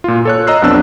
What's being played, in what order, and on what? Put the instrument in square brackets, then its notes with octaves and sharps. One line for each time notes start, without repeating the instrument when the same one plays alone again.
[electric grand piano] A#2 F4
A4 C#5 F#6
D#5 A#5 E6 F#6 C7
B1 F2 B3 D4 E6 F#6